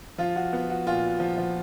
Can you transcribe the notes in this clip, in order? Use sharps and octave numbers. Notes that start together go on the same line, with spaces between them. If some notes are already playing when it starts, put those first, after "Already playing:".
F3 F4
F#4
B3
F#4
A#2 F4
F#4
F3
F3